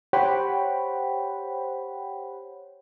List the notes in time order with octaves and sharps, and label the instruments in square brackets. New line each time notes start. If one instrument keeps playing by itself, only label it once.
[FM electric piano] G4 C5 C#5 F#5 G5 B5